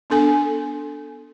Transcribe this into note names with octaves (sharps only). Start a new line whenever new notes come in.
B3 D4 A4 G#5